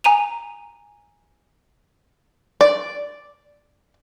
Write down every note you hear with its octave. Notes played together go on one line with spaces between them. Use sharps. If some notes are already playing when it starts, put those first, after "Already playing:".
G#5 A#5 D#7 F7
D5